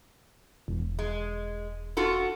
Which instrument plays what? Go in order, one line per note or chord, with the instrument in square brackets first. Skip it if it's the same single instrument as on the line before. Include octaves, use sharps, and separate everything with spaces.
[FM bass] E1
[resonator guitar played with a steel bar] G#3
F4 F#4 A4